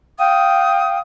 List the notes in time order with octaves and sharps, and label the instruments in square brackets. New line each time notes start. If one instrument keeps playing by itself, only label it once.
[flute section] F5 G5 D#6